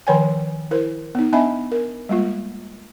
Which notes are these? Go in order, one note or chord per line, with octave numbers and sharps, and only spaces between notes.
D#3 F3 B4 C#5 G5 G#5
E4 A#4 C5
B3 D#4
B3 D4 D#5 E5 G#5 B5
A#4
G3 G#3 A#3 F4